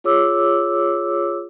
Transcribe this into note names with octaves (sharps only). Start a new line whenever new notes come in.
F4 G#4 C#5 D6 E6